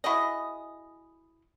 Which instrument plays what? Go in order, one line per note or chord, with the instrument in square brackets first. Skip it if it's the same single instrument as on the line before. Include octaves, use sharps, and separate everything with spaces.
[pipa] E4 F#4 G#4 D#5